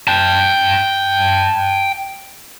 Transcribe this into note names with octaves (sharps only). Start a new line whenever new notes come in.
G5 A5